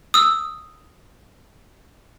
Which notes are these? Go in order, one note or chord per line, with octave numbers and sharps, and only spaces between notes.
D#6 E6